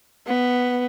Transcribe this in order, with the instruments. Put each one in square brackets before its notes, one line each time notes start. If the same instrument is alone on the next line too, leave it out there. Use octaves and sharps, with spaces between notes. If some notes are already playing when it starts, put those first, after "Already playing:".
[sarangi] B3